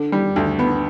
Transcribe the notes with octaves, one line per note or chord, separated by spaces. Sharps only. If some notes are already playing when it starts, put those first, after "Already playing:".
Already playing: D3
G3
D2
B3